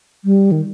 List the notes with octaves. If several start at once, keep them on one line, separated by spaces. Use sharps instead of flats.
G3
D#3